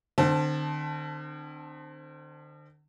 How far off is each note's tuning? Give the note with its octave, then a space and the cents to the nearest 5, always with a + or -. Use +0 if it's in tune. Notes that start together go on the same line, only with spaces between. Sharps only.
D3 +40 C4 +0 A5 -10